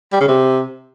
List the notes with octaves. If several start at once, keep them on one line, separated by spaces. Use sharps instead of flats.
G3
C#3
C3